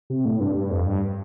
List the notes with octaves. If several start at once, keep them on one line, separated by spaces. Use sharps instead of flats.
C3
A2
G2
G2
F2
G2